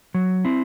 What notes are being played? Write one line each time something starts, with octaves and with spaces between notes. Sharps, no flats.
F#3
C4 E4